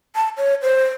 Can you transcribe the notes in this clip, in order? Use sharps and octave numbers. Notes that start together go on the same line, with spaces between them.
A5
C#5
C5